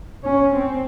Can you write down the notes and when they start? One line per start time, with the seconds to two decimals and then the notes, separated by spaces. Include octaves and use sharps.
0.24 C#4
0.54 C4